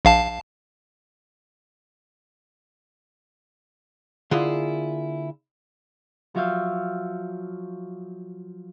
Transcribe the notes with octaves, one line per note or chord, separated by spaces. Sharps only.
A#1 F5 A5
D3 A#3 E4 F4 G#4
F3 F#3 F#4 E5 F5 G6